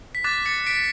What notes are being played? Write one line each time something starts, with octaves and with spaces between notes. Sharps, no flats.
B6
D6 F#6 A6
A6 C#7
B6 D7